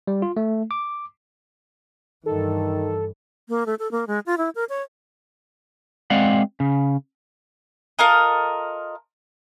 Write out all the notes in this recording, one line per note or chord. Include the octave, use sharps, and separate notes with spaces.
G3
F4
A3
D6
G2 D#3 E3 A4
A#3
A3
A4
A#3
G#3
F4
E4
A#4
C#5
G#3 C4 D5 F5 F#5
C#3
F4 A4 A#4 D#5